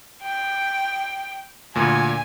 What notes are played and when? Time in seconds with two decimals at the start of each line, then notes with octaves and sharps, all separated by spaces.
0.23 G5
1.75 D2 A#2 G#5